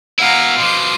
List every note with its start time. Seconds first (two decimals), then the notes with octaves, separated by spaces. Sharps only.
0.19 B2 E4 F5 F#5 A#5
0.58 B2 F3 C6 D6